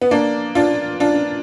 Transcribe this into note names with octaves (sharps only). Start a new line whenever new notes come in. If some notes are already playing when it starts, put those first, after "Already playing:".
B3
A#3 D4
D4 F4
D4 F4